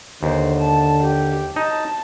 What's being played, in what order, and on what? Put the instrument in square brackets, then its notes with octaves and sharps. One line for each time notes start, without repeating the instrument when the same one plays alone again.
[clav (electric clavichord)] D#2 [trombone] D3 [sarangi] C5
[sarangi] A5
G4
[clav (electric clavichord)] D#4 [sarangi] A5